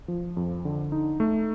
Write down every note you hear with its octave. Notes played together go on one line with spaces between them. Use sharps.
F3
F2
D3
D#4
A3